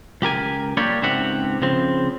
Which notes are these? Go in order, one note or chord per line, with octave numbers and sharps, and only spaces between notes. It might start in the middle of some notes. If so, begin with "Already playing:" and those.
C#2 G4 A#4 G#5
G3 A#3 D4 G4 C#5
C#2 G#2 C4 G4 E5 F#5
C#3 F3 C4